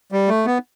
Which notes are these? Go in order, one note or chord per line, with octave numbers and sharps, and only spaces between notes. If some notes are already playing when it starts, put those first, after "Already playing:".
G3
A3
B3